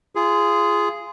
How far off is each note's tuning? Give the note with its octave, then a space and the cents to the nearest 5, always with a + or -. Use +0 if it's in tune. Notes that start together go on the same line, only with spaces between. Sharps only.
F4 -25 G#4 +0